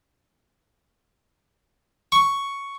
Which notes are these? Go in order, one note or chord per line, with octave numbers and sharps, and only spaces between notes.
C#6